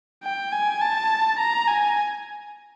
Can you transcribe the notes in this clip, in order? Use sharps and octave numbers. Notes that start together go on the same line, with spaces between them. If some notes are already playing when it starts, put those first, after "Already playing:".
G5
G#5
A5
A#5
G#5